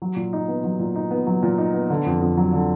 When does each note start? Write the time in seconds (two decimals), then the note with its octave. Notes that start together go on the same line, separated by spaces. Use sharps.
0.02 F#3
0.16 A#2
0.33 D#4
0.48 B3
0.64 F#3
0.79 A#2
0.96 D#4
1.11 B3
1.27 F#3
1.43 A#2
1.58 D#4
1.74 B3
1.90 D3
2.06 F2
2.21 F2
2.37 F#3
2.53 D3